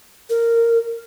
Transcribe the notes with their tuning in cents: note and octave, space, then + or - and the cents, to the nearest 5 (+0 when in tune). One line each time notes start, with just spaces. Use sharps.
A#4 -10